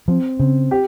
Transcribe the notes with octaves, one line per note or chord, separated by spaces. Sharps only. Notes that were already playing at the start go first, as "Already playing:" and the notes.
F3 C4
C#3 C4
G4